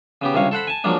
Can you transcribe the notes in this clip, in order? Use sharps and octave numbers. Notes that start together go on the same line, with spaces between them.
C#3 B3 G4
C#2 G2 C3 C#5 F5
A4 C5 F#5 B5
G#5 A5
F3 F#3 G#3 A#3 D4